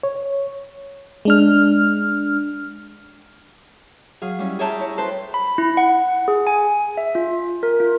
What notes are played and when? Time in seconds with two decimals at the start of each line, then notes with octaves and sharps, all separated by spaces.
0.03 C#5
1.25 G#3 D4 F6
4.22 F#3 G#4 F5 D#6
4.39 G3 C#4 E4
4.59 G#4 C#5 E5 G5 A5 A#5
4.79 E4 C#5
4.98 A4 B4 C5 A5
5.34 B5
5.58 E4
5.77 F#5
6.28 G#4
6.47 G#5
6.97 E5
7.15 F4
7.63 A#4
7.80 F4